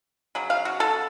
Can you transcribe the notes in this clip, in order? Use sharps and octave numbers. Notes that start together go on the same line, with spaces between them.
C#3 F#3
F5
F#4
A4